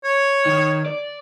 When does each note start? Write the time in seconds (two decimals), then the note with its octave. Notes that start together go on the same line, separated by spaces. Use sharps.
0.04 C#5
0.45 D#3
0.86 D5